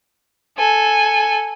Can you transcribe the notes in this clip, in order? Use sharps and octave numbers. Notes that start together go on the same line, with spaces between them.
A4 G#5